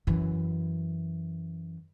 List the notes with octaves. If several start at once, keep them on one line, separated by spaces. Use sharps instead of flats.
F#2 E3